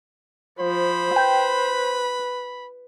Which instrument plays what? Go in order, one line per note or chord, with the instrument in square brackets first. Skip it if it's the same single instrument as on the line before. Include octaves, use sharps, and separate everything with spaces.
[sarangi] F3 [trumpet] C5 [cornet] B5
[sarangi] B4 [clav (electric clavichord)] G5